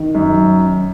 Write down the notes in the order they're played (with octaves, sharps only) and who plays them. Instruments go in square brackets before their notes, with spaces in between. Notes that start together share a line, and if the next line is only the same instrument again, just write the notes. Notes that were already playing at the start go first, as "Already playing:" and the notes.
Already playing: [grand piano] D#3
F#2